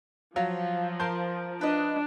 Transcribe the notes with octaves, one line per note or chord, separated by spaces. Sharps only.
F3 F#3 F4
A#4 A5 C6 G6
D4 B4 D#5